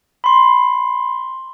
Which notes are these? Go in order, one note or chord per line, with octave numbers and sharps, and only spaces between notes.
B5 C6